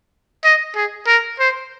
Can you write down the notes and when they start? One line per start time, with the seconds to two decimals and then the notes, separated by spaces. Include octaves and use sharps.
0.44 D#5
0.75 G#4
1.07 A#4
1.39 C5